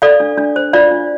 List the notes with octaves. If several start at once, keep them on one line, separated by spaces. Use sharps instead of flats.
A4 D5 F5
D4
D4
C5
F4 D5 F5
D4